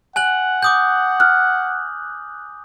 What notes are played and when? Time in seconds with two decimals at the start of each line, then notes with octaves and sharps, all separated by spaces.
0.16 F#5 G#5 F#6 F#7
0.63 D6 D#6 G6
1.20 F6 F#6